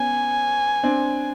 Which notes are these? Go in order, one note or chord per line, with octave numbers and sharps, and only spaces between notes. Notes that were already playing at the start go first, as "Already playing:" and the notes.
Already playing: B3 C#4 G#5
C4 D4